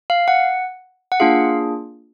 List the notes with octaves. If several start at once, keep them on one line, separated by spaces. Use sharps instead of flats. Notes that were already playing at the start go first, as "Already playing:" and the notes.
F5
F#5
F#5
A#3 D4 F4 G#4 F5